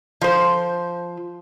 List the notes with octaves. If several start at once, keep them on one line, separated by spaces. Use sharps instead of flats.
F3 C5